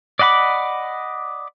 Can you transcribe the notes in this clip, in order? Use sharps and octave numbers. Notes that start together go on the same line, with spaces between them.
D5 D#5 F#5 B5 D6